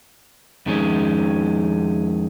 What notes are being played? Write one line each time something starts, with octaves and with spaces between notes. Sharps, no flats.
F2 D#3 G#3 C#4